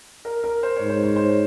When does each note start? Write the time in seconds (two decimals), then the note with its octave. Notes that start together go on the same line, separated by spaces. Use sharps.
0.25 A#4
0.44 A#4
0.63 C5
0.76 G#2 C#5
0.90 C5
1.03 C#5
1.16 C5